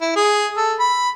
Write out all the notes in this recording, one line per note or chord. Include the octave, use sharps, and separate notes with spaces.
E4
G#4
A4
B5